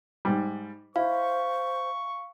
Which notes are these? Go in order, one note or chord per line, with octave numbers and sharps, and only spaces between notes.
G#2 G3
E4 C5 F5 C#6